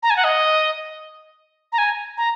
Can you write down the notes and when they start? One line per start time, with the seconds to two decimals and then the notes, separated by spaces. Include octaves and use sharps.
0.03 A#5
0.10 G#5
0.16 F#5
0.24 D#5
1.73 A#5
1.78 G#5
2.17 A#5